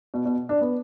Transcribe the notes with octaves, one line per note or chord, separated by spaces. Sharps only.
B2
B2
D4
B3